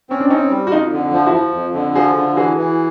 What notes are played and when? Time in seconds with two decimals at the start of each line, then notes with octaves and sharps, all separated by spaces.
0.10 C4 C#4
0.20 D4
0.30 C4 C#4 D#4
0.50 G3
0.67 F#4
0.71 F2 D#4 F4
0.92 D3
1.12 F3
1.27 E4 F#4
1.33 F3
1.54 F2
1.74 D3
1.95 F3 F#4 G#4
2.16 D3
2.37 E3 F#4 G#4
2.57 E3